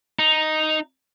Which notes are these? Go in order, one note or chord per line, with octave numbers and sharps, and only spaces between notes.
D#4